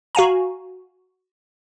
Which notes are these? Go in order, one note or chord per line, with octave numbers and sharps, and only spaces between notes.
F#4 F5 G#5 A#5